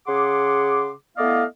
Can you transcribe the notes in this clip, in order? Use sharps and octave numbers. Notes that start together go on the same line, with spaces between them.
C#3 G#4 F#5 C6 D6
A3 B3 E4 D5 D#5 F5